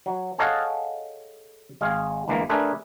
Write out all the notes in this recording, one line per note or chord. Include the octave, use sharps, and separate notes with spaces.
F#3
G#4 A4 C#5 D#5 F5 F#5
G#1 G#3 G#4 F5
G1 E3 G#3 A#3
A3 D4 G#4 A#4 B4 E5